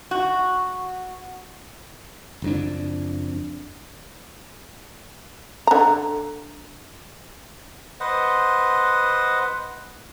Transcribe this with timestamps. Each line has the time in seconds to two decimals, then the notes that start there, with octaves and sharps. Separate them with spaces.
0.11 F#4
2.42 F#1 F2 D4
5.67 D3 A#5
8.00 B4 C5 D#5 F#5